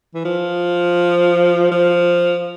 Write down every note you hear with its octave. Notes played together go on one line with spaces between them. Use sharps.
E3
F3
F3